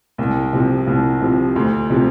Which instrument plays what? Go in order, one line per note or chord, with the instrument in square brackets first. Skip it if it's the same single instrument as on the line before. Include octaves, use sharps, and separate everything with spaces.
[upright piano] C2
C3 F3
C2
C3 F3
D2
C3 F3